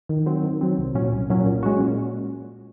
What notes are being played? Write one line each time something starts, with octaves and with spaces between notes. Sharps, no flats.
D#3
F#3 C4
D#3
F#3 C4
C2
A#2 F#3 C#4
C2
A#2 F#3 C#4
A#2
G#3 C#4 F#4
A#2